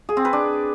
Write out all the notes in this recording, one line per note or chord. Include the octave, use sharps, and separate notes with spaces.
G#4
C4
B4
D4